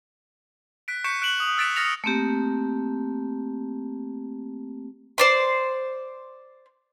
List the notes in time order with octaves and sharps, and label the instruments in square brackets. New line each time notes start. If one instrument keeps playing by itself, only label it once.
[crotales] F#6 B6 D7
C#6 G6 B6 C#7 D7 E7
F#6 D7 E7 F#7
D#6
E6 F#6 A6 B6 D7 E7
D#6 F6 A6 A#6 C#7 F7
[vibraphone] A3 A#3 C4 G4
[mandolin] C5 D5 C6